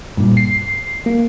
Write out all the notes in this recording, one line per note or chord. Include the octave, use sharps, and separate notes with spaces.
G2 A#2
C7
A#3